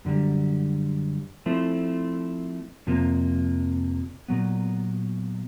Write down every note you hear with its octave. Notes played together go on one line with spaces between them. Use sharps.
F#2 D3 G3
F3 A3 C4 E4
F2 C3 F3 A#3
A#2 F#3 B3